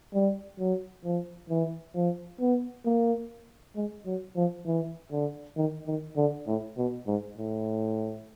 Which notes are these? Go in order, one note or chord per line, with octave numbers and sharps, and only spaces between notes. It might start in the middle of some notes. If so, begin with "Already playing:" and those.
G3
F#3
F3
E3
F3
B3
A#3
G#3
F#3
F3
E3
D3
D#3
D#3
D3
A2
B2
G#2
A2